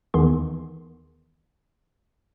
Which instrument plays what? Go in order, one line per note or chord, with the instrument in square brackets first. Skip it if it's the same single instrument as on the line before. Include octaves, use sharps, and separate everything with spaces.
[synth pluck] D#2 D#3 E3 B3 G#4 C6